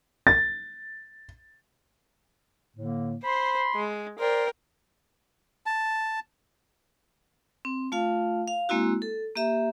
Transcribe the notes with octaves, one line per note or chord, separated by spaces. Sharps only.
A6
A2 D3 A#3
C5 B5 C6
G#3
A#4 C5 D5 G5 C6
A5
C4
A3 F4 F5
F5
G#3 A#3 C4 E4 F#4
A4
A#3 G4 E5 A#5